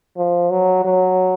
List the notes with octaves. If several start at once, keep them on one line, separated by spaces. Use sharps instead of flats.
F3
F#3
F#3